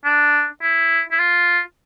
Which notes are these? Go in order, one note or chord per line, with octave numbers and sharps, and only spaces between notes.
D4
E4
E4
F4